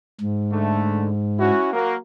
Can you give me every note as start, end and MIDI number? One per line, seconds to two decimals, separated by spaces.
0.21 1.51 44
0.51 1.08 50
0.51 1.08 57
1.39 1.70 61
1.39 1.70 64
1.39 1.70 66
1.73 1.96 54
1.73 1.96 58